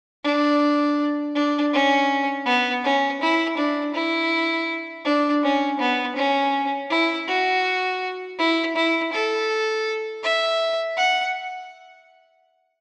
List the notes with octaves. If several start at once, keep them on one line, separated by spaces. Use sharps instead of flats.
D4
D4
C#4
B3
C#4
E4
D4
E4
D4
C#4
B3
C#4
E4
F#4
E4
E4
A4
E5
F#5